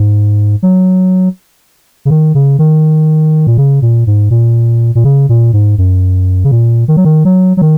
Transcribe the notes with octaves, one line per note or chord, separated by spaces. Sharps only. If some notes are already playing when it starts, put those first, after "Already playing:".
Already playing: G#2
F#3
C#3
D#3
C#3
D#3
A#2
C#3
A#2
G#2
A#2
A#2
C#3
A#2
G#2
F#2
C#3
A#2
D#3
F#3
D#3
F#3
F#3
D#3